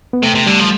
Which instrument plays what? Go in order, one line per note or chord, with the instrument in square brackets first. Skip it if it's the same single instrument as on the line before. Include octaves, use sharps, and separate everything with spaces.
[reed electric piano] B3
[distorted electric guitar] C3 [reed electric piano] A3
[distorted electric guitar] C3
[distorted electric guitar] D3 [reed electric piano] G3
[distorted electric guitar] F3